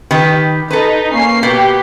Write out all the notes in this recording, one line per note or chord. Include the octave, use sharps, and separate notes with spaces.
D#3 G4 B4
D#4 A4 B4
A#3 C#4 C7
B2 G4 B4